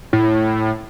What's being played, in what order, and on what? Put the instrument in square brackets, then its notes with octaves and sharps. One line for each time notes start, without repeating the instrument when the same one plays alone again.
[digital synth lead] A2